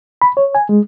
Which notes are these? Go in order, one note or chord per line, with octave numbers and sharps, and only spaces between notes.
B5
C#5
G#5
G#3